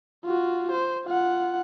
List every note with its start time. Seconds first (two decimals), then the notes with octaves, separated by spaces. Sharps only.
0.25 F4 F#4
0.71 C5
1.05 F4 F#5